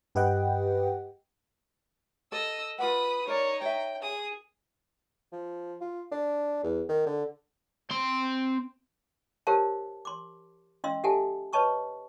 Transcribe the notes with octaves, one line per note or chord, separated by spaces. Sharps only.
G2 G4 B4 D#5 F#5 G5
A4 D#5 E6
F4 B4 F#5 B5 D#6
D#4 A#4 C#5 D5
C#5 E5 G5
G#4 D#6
F3
F4
D4
E2
D#3
D3
C4 C6
G4 A#4 C5 C#5 F5 A5
C6 D6
C#4 D#5 F5 C6 E6
G4 A4 E5 F#5 G#5 A5
B4 C#5 D#5 A5 C#6 D#6